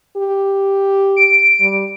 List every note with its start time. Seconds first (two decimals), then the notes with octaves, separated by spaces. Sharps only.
0.17 G4
1.17 D7
1.61 G3